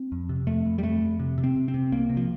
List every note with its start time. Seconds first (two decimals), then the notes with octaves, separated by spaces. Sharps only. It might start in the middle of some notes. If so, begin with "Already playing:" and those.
Already playing: C4
0.12 F2
0.29 C3
0.47 F2 A3
0.66 F2
0.78 G3
0.83 F2 A3
1.02 F2
1.19 C3
1.38 C3
1.44 C4
1.56 C3
1.68 C4
1.74 C3
1.92 C2 A#3
2.10 C3
2.17 F3